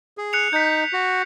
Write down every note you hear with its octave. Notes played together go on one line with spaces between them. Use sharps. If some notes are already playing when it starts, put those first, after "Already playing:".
G#4
F#6 C#7 F7
D#4 G6 B6
F#4